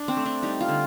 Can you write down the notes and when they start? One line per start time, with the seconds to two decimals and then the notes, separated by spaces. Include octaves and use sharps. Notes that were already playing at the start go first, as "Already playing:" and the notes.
Already playing: D4
0.08 C4
0.17 A3
0.26 D4
0.43 G3 D#4
0.61 F4
0.69 D3